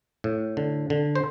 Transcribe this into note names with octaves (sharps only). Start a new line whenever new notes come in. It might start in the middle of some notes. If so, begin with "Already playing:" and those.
A2
D3
D3
C5